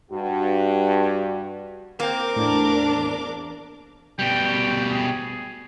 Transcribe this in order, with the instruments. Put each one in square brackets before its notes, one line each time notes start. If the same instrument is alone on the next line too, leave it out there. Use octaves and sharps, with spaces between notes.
[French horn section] G2 F#4
[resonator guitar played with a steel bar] A#3 C4 [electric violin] A#4 D6
[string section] E2 D4 [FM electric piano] A2
[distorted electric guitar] B2 G3 [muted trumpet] G5
[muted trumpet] G#4